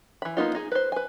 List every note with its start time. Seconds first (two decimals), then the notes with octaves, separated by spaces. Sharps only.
0.22 E3 B5
0.37 A#3 B3 D#4 F4
0.55 D#4 G#4
0.72 B4 C5
0.92 B4 G#5